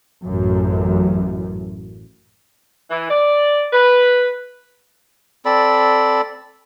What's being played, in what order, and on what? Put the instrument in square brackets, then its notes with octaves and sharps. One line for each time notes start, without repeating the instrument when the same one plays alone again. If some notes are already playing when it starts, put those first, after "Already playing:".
[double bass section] A1 F#2
[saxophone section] E3
D5
B4
[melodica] C4 A4 D5 B5